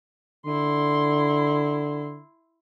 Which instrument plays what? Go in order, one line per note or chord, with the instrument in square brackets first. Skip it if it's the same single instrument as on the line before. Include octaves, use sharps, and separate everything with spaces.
[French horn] D3 [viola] E4 C6